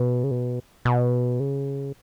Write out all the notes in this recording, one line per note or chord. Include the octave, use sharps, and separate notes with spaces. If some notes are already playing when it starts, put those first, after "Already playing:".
Already playing: B2
C#3
B2
B2
C#3